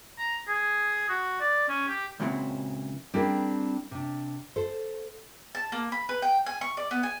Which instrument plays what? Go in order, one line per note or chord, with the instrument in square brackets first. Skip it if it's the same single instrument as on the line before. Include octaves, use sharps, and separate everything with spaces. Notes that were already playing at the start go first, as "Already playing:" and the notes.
[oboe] A#5
G#4
F#4
D5
C#4
G4
[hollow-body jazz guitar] C#2 A#2 C#3 F#3 C4 E4
[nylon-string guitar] G3 C4 D4 E4 G#4 A#4
C3 D4
A4 C5
[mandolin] A5
A#3
B5
B4
G5
G#5
C#6
D5
B3
G#5